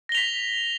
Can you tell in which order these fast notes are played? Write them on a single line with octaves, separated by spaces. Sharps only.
A#6 G7 F7 B6